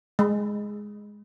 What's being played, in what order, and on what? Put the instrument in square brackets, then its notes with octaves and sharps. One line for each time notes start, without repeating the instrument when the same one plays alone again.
[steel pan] G#3